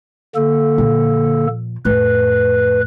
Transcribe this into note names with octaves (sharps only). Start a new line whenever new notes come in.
D3 A#3 A4
A#2 F3
F2 A2 B4